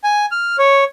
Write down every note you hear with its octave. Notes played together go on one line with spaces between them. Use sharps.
G#5
F6
C#5